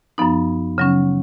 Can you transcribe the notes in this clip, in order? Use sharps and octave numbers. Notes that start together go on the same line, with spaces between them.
F#2 F3 B3 D#4
C#3 F#3 C#4